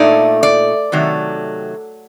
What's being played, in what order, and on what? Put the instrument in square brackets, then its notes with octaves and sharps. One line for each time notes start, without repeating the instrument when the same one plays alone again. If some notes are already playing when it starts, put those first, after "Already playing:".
Already playing: [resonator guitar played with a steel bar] A#2 A3 D#4 D5
D5
C3 D#3 F#3 A3